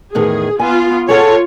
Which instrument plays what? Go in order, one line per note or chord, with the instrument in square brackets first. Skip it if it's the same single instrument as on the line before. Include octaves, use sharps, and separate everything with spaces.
[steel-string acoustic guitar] E2 A2 D#3 [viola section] G#4
[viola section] B3 F4 [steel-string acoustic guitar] G#5
[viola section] F4 C#5 [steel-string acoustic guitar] G#4 A4 F#5